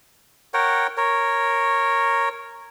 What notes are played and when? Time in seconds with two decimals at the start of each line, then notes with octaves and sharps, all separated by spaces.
0.54 A#4 C#5 F#5 G5
0.97 A#4 C#5